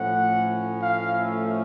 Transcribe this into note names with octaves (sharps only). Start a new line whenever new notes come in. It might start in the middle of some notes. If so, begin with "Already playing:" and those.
Already playing: A2 F3 A3 C#4 F#5
F5
E5